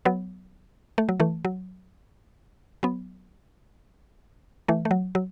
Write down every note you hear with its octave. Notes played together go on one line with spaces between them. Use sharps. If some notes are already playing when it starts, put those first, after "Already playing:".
F#3 B3
A3
F#3
E3 A3
F#3
F#3 B3
E3 A3
A3
F#3
F#3